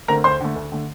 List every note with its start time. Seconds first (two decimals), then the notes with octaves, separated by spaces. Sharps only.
0.08 D3 A3 C4 A#4 A#5
0.24 D2 C5 C6
0.41 D3 A3
0.56 D2
0.72 D3 A3